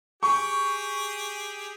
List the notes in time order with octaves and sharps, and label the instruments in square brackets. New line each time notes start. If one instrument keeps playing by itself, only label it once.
[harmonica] G4 G#4 [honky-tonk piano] C#6